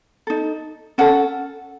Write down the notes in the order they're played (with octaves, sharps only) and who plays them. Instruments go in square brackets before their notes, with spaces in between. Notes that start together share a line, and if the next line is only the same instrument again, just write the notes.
[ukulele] D#4 A4
C#4 A4 F#5